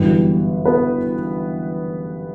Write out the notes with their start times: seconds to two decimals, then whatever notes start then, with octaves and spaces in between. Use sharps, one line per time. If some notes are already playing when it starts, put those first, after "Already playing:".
Already playing: G1 F#2 E3 G3 B3 B4
0.65 B3 B4